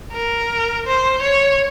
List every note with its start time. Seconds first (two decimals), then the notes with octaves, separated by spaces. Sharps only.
0.12 A#4
0.86 C5
1.21 C#5